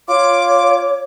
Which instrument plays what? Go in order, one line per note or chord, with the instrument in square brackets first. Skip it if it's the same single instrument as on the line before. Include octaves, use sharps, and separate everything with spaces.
[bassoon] F4 [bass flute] C#5 [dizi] D6